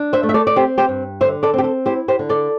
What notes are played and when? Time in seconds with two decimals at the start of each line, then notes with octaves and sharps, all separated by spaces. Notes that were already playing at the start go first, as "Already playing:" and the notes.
Already playing: D4
0.13 C5 E5
0.23 A3
0.29 E5
0.34 A4 D5
0.47 D5
0.56 C4 G4 C5
0.78 G4 C5
0.89 G2
1.21 D3 C5 E5
1.43 A4 D5
1.54 C4 G4
1.64 A4
1.86 E4 G4 C5
2.08 G4 C5
2.19 D3
2.29 A4 D5